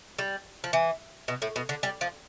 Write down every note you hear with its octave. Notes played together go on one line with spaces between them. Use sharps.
G3
F3
E3
B2
A2
B2
D3
G3
F3